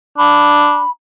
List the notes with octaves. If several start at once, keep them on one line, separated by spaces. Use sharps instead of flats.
D4 B5